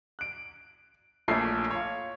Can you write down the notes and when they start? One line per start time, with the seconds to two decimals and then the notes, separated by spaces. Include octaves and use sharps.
0.19 F#6 D7
1.28 A#1 A#2 A3 C#5 C7
1.71 F4 C#5